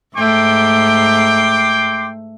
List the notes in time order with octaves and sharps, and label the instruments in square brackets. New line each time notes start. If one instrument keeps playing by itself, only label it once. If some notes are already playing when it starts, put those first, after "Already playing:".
[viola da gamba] G#2 A3 [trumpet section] G5 C6 D6